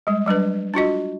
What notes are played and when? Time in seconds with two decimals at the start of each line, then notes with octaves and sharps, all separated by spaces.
0.07 G3 G#3
0.26 F#3 G3 D4 B4
0.74 D4 F4 F#4 D#5